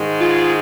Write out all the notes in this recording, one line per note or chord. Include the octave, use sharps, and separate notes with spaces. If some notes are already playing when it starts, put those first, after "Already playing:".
Already playing: G#2 D#3 G#3
F4 G#4